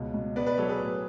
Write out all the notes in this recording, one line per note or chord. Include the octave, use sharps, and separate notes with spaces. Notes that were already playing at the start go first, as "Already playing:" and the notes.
Already playing: C#2 B2
B2
B3 B4 D5
B4 D5
F#3 A4 C#5
G#4 B4
A2